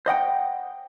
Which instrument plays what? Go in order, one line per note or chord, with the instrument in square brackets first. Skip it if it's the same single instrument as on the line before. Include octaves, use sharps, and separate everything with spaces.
[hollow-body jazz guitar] C5 D#5 F#5 G5